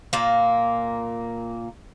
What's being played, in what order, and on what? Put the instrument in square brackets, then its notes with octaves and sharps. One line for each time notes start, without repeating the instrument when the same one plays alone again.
[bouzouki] A#2 A#3